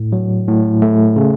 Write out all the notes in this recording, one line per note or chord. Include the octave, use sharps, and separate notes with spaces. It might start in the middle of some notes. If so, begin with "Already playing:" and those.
Already playing: A2
F#3
A2
A3
C#3